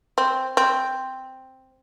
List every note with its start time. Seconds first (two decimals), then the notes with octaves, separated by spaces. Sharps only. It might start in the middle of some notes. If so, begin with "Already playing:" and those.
0.18 C4
0.57 C4